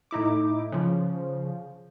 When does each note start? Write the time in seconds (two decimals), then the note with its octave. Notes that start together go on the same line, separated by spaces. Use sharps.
0.11 A2 D#4 E4 D6
0.72 C#3 F3